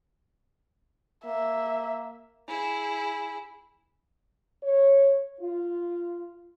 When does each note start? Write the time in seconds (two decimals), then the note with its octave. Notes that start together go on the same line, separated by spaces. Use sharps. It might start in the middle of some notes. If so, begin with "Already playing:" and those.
1.26 A#3 E5
2.48 E4 G#4
4.63 C#5
5.41 F4